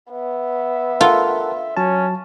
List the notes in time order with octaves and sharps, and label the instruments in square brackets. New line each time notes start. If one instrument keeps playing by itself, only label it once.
[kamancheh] B3 [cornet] E5
[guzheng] F4 [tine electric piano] A4 A#4 F#5
[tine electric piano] F#3 A5 [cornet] C#4